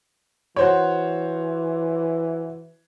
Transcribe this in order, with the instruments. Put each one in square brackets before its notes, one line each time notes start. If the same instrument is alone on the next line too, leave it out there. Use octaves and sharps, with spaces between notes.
[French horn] E3 [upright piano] F#4 C5 C#5